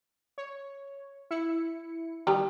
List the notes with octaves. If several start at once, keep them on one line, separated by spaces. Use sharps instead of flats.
C#5
E4 C#7
D#3 G3 G5 A#5